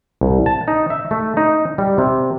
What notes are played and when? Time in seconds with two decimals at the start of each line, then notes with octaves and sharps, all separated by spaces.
0.21 C2
0.46 A5
0.68 D#4
0.90 E5
1.11 A3
1.37 D#4
1.78 G3
1.98 C3